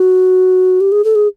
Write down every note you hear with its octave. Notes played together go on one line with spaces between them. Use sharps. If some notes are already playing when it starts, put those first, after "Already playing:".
Already playing: F#4
G4
G#4
A4
G#4